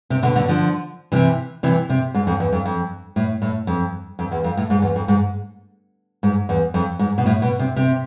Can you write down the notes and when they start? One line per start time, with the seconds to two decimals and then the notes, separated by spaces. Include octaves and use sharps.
0.10 C3
0.23 B2 D3
0.36 B2 D3
0.48 D3 F3
1.12 C3 E3
1.63 C3 E3
1.89 C3
2.14 G#2
2.27 F2
2.40 E2
2.53 F2
2.65 F2
3.16 A2
3.42 A2
3.67 F2
4.19 F2
4.31 E2
4.44 F2
4.57 A2
4.70 G#2
4.82 E2
4.96 F2
5.08 G#2
6.23 G#2
6.49 E2
6.74 F2
6.99 G#2
7.18 B2
7.26 A2
7.42 B2
7.59 C3
7.76 C3